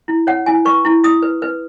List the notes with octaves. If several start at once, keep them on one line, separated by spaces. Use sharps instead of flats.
E4
C#5 F#5
E4 G#5
B4 C#6
E4
E4 D#6
B4
B4